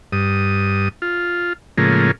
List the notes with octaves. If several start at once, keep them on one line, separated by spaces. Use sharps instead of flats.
G2 D#6
F4
A2 C#3 F3 G#3 A#3